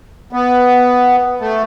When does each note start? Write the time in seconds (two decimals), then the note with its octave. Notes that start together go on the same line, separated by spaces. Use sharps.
0.33 B3
1.40 A3